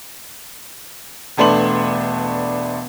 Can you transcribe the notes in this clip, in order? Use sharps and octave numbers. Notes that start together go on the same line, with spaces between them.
E1 A3 D4 B4 C6 F#7